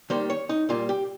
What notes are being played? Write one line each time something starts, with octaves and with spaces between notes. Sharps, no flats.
D#3 G3 A#3 C5
C#5
D#4
A#2 G3 A#3 F4
G4